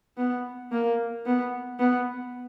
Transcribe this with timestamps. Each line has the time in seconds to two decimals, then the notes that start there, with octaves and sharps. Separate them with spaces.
0.17 B3
0.72 A#3
1.26 B3
1.79 B3